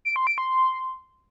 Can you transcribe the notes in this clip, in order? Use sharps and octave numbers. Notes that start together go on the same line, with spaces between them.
D7
C6
D7
C6